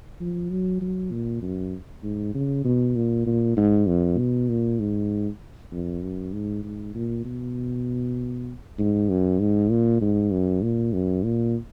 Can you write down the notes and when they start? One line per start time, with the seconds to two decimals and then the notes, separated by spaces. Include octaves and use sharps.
0.20 F3
0.50 F#3
0.81 F#3
1.11 A#2
1.42 F#2
2.04 G#2
2.35 C#3
2.65 B2
2.96 A#2
3.26 A#2
3.57 G#2
3.88 F2
4.18 B2
4.49 A#2
4.80 G#2
5.72 F2
6.02 F#2
6.33 G#2
6.64 G#2
6.95 A#2
7.25 B2
8.79 G#2
9.10 F#2
9.40 G#2
9.71 A#2
10.01 G#2
10.32 F#2
10.63 A#2
10.93 F#2
11.23 A#2